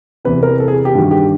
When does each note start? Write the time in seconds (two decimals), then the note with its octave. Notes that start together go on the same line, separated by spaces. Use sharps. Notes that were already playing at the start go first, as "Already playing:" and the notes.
0.25 E2 C3 E3 B4
0.43 A#4
0.60 A4
0.68 G#4
0.85 G4
0.95 G2 D#3 F#4
1.11 G4